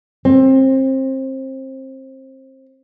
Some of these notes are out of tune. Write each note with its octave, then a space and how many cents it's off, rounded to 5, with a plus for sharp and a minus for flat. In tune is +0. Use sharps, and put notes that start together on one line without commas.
C4 +25